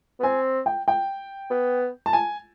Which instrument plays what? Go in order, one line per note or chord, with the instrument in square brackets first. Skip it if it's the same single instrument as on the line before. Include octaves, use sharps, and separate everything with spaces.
[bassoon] B3
[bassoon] C4 [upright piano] G#5
[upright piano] G5
G5
[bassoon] B3
[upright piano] A5
G#5